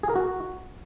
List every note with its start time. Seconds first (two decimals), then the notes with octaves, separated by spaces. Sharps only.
0.03 G#4
0.09 A#4
0.16 F#4